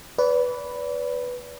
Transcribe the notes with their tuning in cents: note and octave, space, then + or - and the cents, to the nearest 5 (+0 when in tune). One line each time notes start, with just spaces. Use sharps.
B4 +0 D5 -35